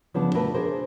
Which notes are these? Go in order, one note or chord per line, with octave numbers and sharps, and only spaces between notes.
C#3 F3 B3 D4
B2 D3 A3 A#4 B4
D4 G#4 A#4 C5